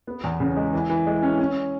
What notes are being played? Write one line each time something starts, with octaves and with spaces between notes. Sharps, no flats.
B3
E2
C#3
G#3
E3
E3
G#3
C#4
C#4